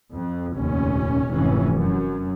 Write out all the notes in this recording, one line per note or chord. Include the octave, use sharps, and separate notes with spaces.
F2
F1 D#2 A#2 C#4
F1 G#2 E3 C#4
F#2